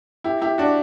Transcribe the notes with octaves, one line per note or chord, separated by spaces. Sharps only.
E4 G4
E4 G4
D4 F#4